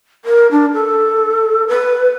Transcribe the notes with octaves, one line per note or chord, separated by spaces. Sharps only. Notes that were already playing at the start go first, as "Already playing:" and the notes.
A#4
D4
A4
B4